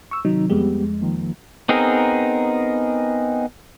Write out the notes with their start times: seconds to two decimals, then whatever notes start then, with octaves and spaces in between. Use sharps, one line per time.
0.11 C#6 E6
0.25 C3 D#3 F#3 D#4
0.50 F2 G3 G#3 B3 G4
1.01 D#3 F3 A#3
1.69 B3 C4 D#4 G#4 A#4